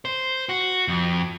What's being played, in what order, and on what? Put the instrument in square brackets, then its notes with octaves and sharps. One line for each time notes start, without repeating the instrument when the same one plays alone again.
[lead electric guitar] C5
F#4
F2